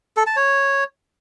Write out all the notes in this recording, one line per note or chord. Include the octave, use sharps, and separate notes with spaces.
A4
A5
C#5